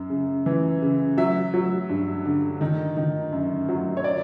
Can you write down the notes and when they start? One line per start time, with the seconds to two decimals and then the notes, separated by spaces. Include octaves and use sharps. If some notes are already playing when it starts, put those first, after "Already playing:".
Already playing: F#2
0.10 C#3
0.46 E3
0.82 C#3
1.17 F#3 E5
1.54 F#3
1.89 G2
2.25 D3
2.61 D#3
2.97 D#3
3.32 F#2
3.69 F#3
3.97 C#5
4.04 D5